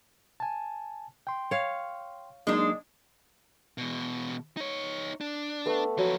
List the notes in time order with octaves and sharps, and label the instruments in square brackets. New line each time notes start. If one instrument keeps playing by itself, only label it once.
[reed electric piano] G#5 A5
G5 C6
[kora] C#5 F5
[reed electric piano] F#3 A#3 D#4 [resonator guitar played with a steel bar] G#3 D4
[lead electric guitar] E2 B2
D#4 C#5
D4
[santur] A3 B3
[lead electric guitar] F3 B4 [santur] F#3